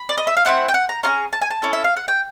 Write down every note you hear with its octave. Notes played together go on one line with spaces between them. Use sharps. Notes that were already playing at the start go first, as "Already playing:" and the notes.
Already playing: B5
D5
D#5
E5
F5
A3 C4 E4 F#5
G5
F#5
A#5
C#4 F4 G#4 A#5
A5
G#5
A5
C#4 E4 A4
E5
F5
F#5
G5